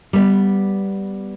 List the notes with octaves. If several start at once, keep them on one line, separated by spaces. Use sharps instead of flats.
G3 B3